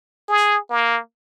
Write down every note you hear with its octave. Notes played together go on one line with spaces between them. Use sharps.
G#4
A#3